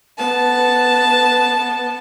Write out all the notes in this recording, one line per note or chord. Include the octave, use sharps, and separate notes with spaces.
B3 B4 A5